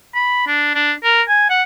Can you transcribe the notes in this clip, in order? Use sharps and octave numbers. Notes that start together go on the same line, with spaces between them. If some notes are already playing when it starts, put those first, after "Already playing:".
B5
D4
D4
A#4
G#5
F#5